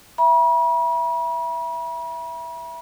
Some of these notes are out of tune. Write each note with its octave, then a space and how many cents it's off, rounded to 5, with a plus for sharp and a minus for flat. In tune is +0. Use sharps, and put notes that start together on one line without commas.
E5 +10 B5 -45